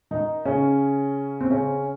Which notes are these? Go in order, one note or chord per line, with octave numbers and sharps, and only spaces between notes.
D#3 D#4
C#3 C#4
C4
C#3 C#4